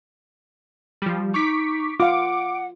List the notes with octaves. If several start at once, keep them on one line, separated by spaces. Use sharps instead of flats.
F3 G3
D#4 C#6 D6 B6
F4 F5 F#5 D6